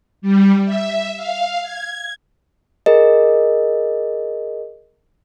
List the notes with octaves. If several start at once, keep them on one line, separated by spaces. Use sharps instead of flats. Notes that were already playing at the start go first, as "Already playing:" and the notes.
G3
E5
F5
G#6
G#4 A#4 D#5